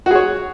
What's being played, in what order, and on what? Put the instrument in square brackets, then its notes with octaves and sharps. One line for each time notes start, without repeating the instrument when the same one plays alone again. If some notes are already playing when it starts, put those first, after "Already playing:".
[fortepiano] F#4
G#4
C#5